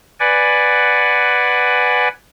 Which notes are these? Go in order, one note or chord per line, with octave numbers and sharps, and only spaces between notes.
B4 D5 F#5 G#5